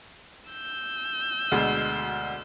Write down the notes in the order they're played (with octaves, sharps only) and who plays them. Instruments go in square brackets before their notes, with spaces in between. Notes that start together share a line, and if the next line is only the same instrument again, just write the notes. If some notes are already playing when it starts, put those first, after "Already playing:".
[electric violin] E6 G6
[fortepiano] D2 B2 G#3